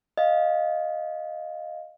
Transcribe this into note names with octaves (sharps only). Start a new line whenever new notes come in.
D#5 F5